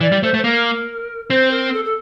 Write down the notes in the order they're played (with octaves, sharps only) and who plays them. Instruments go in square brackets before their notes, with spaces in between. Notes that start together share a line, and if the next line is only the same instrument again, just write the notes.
[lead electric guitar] E3 [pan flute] D5
[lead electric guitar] G3
[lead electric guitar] A3 [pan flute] C5
[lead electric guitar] A3
[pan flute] C5
[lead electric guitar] A#3 [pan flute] A#4
[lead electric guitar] C4 [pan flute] C5
[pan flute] A#4
A4
A4